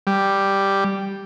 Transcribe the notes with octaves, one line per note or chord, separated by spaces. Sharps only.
G3